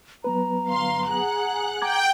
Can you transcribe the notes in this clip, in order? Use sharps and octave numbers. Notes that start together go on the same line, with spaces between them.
F#3 B3 B4 A#5
G1 F5 C6
G#4 F#5 F#6
G5 A#5 D6 G#6